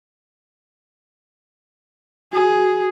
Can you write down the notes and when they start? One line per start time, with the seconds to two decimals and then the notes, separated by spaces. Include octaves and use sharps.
2.33 F#4 G#4